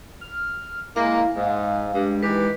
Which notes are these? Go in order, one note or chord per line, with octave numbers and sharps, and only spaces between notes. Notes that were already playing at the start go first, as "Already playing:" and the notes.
F6
G#3 A#3 E4 F5
G#2 G#3
G2
D#3 E3 G#3 G4 B4